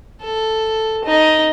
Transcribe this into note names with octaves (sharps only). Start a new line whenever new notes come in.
A4
D#4